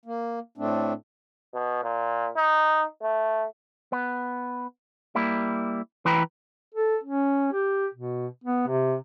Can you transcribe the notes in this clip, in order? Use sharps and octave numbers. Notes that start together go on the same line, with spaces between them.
A#3
A2 A3 C4 D4
B2
A#2
D#4
A3
B3
G3 A#3 E4
E3 E4 B4 G5 A#5 B5
A4
C#4
G4
B2
B3
C3